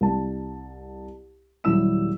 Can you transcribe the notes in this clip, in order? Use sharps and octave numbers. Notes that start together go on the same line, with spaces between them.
C2 A5
D#1 F#3 G3 E4 E6 E7